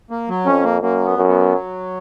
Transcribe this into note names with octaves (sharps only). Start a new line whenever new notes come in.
A#3
F#3
F2 C#4
A#3
F#2 A#3
B3
F#2
B3
F#3